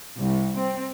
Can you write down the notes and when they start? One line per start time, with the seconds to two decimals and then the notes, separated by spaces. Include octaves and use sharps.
0.17 C2
0.57 C4